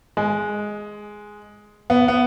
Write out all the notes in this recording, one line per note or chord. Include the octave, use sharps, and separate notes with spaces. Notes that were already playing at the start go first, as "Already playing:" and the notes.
G#3
B3
B3